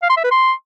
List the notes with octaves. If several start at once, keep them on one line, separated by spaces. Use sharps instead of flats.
F5
C6
E5
B4
C6